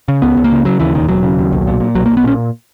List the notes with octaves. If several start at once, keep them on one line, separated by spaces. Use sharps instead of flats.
C#3
C#2 B3
C#2
A#3
C#3
C#3 F#3
D#2 E3
E1 D#3
E1 F#3
C#3
D#2
B1
A#2
A#2
B1 F#3
B1 A#3
B3
A#2 C#4